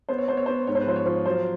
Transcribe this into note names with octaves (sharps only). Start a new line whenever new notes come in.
B3 C5
C#5
B3 C5
C#5
B3 C5
G#2 C#5
C5
B4
F3 C5
C#5
F3
F#3 C5